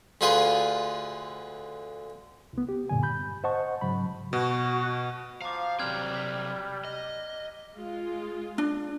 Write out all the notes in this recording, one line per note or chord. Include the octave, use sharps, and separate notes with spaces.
D2 D3 F4 G#4 B4 C6
C2 B3
G4
F#2 A#2 D3 G#5
G2 B5 G6
C5 D#5 F#5 A5 C#6
G#2 C#3 F#3 B5
B2 F#4
F3 F5 A#5 D6
C3 F#3 G3 C4 F6 F#6 G#6
B6
D#5
G#3 F4
D4